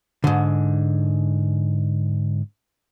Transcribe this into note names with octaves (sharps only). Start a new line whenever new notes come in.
G#2 D3